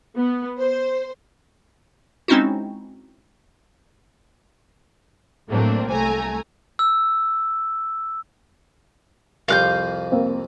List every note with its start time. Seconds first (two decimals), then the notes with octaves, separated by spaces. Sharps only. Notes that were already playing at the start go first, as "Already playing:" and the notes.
0.17 B3
0.59 C5
2.28 G#3 C4 C#4 D#4 E4 F#4
5.49 A2 F#3 A3 A#3 C4 D4
5.87 C2 A3 G#5 A#5
6.79 E6
9.48 C2 F2 C3 F5 F#6 G6
10.12 A#3 C4